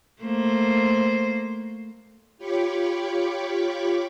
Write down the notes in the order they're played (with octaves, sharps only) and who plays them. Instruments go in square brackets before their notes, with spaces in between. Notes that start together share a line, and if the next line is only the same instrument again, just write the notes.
[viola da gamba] A3 A#3 C5
[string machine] F4 G4 C#5 B5 C#6 D6